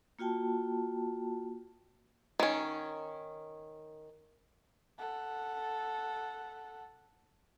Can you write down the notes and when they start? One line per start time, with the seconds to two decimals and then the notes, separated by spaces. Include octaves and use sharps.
0.19 A#3 F4 F#4 G5 A5
2.40 D#3 C#4
4.98 A4 F#5